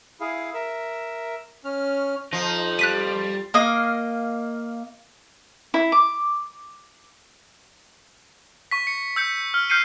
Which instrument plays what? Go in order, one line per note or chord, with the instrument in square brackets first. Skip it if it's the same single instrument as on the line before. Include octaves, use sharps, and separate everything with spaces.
[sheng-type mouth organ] E4 G#4 F5
A#4 E5
C#4 F6
[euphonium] F2 [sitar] F3 [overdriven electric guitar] D#4
[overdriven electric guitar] G3 [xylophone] F#6 B6 D#7
[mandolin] A#3 D#5 F5
[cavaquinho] E4
D6
[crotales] C#6 B6
C#7
E6 G6 C#7
F6
F6 G6 C7 C#7 D#7